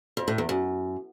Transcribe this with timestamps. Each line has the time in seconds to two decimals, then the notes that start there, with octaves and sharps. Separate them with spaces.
0.17 F2
0.28 A2
0.38 E2
0.49 F#2